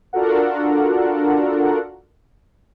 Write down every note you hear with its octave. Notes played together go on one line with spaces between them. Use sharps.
D4 F4 F#4 A4 A#4 F#5